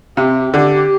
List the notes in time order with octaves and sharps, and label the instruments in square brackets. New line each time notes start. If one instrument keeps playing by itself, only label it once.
[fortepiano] C3 [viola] G4
[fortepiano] D3 [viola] G4